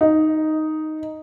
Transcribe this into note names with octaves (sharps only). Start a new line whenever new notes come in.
D#4